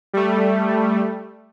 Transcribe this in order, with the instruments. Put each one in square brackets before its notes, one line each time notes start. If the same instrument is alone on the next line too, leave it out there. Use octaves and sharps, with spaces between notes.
[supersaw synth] G3 A3